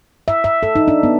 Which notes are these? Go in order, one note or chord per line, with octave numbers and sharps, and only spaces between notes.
E5
E5
A4
D#4
D4
B3